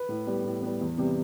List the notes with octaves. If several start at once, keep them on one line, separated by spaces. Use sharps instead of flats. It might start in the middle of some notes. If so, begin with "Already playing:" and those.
Already playing: B4
A2
G3 B3
A2
G3 B3
E2
C3 G3 B3